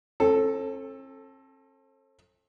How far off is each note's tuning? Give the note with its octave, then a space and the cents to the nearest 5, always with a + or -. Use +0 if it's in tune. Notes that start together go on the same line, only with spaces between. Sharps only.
C4 +45 A4 +0